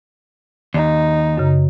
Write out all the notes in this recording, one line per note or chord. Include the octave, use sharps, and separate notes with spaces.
D#2 D#4
F#2 C#3